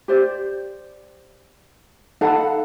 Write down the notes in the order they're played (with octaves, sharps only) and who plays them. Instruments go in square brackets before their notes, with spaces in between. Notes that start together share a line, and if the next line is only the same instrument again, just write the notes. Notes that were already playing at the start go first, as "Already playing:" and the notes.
[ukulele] G4 C5 D5
[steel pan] D#4 A4 [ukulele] F5 F#5 B5